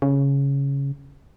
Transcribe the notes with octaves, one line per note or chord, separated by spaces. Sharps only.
C#3